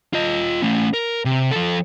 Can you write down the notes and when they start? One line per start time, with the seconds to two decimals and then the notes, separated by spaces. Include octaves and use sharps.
0.13 F4 D#5
0.62 A3 C#4
0.94 A#4
1.25 C3
1.51 F3 A4